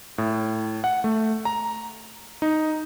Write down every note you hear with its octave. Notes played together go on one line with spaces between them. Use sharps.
A2
F#5
A3
A#5
D#4